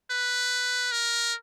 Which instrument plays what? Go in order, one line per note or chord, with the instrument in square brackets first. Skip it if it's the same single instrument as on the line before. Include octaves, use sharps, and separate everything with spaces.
[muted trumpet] B4
A#4